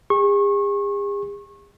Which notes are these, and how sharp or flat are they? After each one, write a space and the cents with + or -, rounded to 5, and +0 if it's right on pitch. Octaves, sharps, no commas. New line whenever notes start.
G#4 -45 C#6 -30